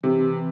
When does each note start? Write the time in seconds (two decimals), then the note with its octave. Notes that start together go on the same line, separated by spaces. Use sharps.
0.03 C3 E3